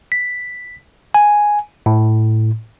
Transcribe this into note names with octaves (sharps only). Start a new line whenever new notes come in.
B6
G#5
A2